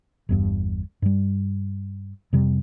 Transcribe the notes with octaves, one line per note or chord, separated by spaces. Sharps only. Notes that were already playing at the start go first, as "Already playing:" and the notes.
G1 E2 G2
G2 G3
F2 C3 G3